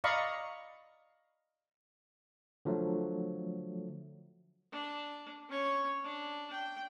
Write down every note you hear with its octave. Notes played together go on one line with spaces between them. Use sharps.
D5 D#5 F5 A#5 B5 C#6
D3 F3 F#3 A3
D4
C#4 C#5
D4
G5